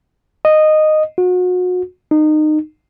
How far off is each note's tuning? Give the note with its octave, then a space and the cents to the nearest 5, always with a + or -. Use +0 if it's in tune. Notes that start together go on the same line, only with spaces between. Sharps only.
D#5 -10
F#4 -35
D#4 -25